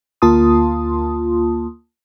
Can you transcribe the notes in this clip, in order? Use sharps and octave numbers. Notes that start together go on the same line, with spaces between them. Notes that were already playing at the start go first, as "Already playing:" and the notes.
D2 A#3 F4 A5 C6 D#6